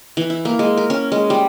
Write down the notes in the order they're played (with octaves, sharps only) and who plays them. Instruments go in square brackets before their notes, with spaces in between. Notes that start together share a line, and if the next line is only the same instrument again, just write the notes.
[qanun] E3
E4
A#3
G#3
A#4
C#4
G#3
G3